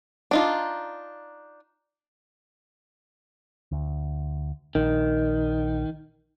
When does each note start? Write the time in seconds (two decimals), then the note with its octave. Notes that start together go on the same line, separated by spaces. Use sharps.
0.31 D4 D#4 F4
3.72 D2
4.75 A#1 D#3